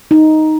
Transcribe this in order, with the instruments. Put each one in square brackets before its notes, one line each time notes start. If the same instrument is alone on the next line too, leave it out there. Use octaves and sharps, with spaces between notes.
[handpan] D#4